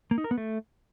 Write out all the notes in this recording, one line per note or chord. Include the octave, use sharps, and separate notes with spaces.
A#3
D#4
A#4
B3
A3